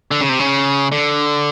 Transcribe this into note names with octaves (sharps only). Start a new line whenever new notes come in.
D3
C#3
C3
C#3
D3